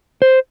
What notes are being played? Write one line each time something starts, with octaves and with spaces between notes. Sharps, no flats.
C5